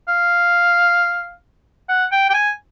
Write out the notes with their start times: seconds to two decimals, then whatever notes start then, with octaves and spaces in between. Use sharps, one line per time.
0.08 F5
1.89 F#5
2.12 G5
2.30 G5
2.34 G#5